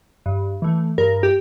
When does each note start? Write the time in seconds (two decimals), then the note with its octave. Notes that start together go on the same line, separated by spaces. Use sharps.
0.26 G2
0.62 E3 A3
0.98 G2 A#4
1.23 G4